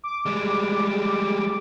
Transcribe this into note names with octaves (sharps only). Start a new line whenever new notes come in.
D6
G3 G#3